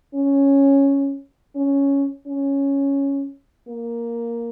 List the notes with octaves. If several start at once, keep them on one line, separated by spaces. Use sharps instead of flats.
C#4
C#4
C#4
A#3